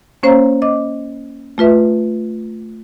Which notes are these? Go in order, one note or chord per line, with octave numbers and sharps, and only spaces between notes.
A#3 C#4 C5 C#5 F5 A#5
D#5 D6
A3 F4 B4 E5